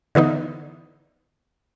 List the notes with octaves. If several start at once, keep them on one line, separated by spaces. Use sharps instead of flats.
D3 E3 B3 D#4